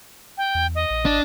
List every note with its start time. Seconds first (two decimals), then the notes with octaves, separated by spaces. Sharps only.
0.38 G5
0.55 E2
0.75 D#5
0.90 A#1
1.05 G#1 D4